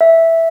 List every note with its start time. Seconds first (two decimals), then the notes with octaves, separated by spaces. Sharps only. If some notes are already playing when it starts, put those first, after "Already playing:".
0.01 E5